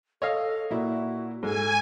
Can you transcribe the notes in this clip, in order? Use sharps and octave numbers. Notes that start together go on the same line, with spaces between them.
A4 C#5 D#5 F5
A#2 E4 F#4
G#2 A4 G#5